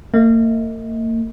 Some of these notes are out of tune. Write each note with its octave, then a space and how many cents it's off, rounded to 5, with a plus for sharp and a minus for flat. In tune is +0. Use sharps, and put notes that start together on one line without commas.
A#3 -40 D#5 +35